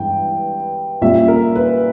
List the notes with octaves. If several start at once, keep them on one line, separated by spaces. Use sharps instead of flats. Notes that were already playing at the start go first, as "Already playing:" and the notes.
Already playing: G2 E3 G#3 B3 G5
A#2 G3 C#4 E5
A#4
B4